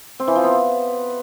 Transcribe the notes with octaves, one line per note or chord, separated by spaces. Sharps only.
C4
E3
F3
B3